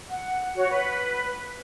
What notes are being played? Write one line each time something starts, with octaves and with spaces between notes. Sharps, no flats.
F#5
F#4 C#5
B4